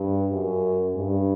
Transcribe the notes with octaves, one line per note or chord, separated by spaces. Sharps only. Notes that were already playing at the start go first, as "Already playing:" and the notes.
Already playing: G2
F#2
G2